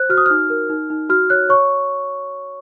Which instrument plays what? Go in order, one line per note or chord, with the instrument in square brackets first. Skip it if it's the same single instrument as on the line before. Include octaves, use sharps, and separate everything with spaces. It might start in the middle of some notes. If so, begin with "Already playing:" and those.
Already playing: [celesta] C5 F#6
F#4 F6
D#6
D#4 F6
A#4
D#4
D#4
F#4 F6
C#5 F#6
C#5 C#6